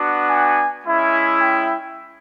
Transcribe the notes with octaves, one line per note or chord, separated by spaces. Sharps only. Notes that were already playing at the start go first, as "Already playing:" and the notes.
Already playing: B3 D4 F#4
G#5
G#3 C#4 E4
G5